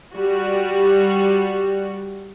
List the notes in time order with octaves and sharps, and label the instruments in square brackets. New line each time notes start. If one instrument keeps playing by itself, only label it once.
[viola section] G3 F#4